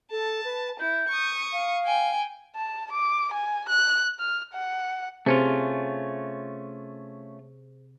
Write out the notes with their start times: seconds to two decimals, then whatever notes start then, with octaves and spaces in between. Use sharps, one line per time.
0.11 A4 A5
0.45 B4
0.79 E4 G6
1.08 C#6 D#6
1.53 F5
1.84 G5 G#5
2.56 A5
2.92 D6
3.33 G#5
3.69 F#6
4.19 F6
4.54 F#5
5.26 C3 A3 C#4 F4 G#4 C5